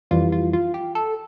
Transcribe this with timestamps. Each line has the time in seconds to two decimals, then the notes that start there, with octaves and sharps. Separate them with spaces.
0.11 F2 E3 G3 F4
0.32 F4
0.53 F4
0.74 G4
0.95 A4